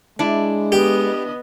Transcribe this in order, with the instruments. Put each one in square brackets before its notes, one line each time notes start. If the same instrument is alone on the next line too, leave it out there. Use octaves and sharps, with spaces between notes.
[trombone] G#3 [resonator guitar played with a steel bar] D4 E4
[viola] B3 D#5 [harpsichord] G4